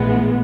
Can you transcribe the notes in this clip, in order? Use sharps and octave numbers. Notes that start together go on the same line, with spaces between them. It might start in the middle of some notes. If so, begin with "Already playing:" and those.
Already playing: A#1 A2 E3 G#3 B3